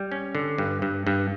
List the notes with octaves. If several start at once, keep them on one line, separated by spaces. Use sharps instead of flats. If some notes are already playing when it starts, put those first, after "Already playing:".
Already playing: G3
C#4
D3
G2
G2
G2